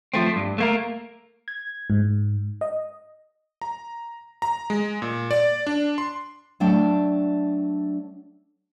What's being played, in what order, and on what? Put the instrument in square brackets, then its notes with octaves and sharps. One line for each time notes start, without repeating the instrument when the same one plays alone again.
[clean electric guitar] F3 A3 C4
G2
A3 A#3 A#4
[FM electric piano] G#6
G#2
D#5
[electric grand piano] A#5
A#5
G#3
A#2
D5
D4
C6
[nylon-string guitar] F#3 A3 D4 G5